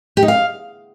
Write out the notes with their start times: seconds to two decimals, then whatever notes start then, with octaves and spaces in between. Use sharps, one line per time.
0.17 G4
0.23 D#4
0.28 F5